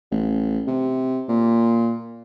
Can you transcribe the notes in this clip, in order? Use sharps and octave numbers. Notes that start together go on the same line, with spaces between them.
A1
C3
A#2